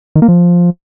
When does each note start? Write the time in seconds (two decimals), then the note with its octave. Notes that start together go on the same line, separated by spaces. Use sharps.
0.16 D#3
0.22 A#3
0.28 F3